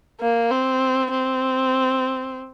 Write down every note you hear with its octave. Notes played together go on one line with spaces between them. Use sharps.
A#3
C4
C4